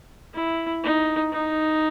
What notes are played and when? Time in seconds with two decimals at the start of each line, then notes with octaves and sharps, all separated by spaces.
0.34 E4
0.83 D#4
1.32 D#4